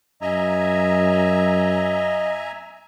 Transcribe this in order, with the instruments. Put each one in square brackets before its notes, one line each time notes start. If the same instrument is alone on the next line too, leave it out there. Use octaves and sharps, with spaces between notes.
[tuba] F#2 [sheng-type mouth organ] D#5 [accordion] E5 G#5 A#5